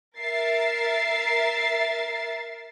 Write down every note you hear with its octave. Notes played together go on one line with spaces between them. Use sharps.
A#4 E5 A6 C7